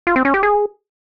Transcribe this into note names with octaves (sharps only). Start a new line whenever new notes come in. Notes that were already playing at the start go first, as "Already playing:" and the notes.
F4
C4
C#4
G4
G#4